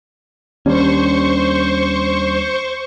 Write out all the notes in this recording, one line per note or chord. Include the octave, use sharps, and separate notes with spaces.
D#2 G3 C#4 D4 C5 C#6